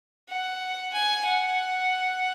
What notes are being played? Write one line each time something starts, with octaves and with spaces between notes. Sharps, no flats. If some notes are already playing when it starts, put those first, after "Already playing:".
F#5
G#5
F#5